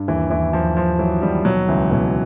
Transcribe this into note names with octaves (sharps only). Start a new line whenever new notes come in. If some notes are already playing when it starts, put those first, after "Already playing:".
Already playing: G2
D#2 E3
D#2 E3
D#2 F3
D#2 F3
E3 F#3
D#2 G3
B2 F#3
C#2 E3
B2 E3